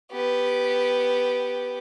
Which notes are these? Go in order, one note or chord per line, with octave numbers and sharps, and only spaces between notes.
B3 G4